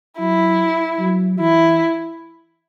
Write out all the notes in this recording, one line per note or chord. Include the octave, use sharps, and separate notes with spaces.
F#3 E4
F#3
E3 E4